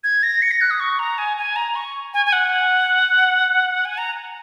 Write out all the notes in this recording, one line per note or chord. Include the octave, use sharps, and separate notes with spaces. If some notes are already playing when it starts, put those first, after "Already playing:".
G#6
A#6
C#7
A#6
F#6
D#6
C#6
A#5
G#5
G#5
A#5
C#6
G#5
G#5
F#5
G#5
A#5